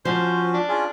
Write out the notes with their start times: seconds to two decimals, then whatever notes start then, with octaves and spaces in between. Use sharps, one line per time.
0.05 F3 C#4 F#4 C5
0.54 D4
0.68 C#4 F4 G#4